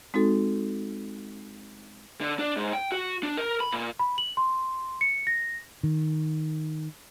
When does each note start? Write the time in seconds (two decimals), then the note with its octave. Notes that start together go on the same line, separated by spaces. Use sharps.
0.14 G#3 C4 D#4 F#4 A4
2.21 D3
2.39 D4
2.57 G#2
2.73 G5
2.92 F#4
3.23 D4
3.37 A#4
3.60 B5
3.72 A#2
3.99 B5
4.18 F#7
4.37 C6
5.01 C#7
5.27 A#6
5.83 D#3